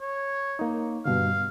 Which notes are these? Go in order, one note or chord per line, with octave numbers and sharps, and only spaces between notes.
C#5
A#3 D#4
G2 B2 D3 F5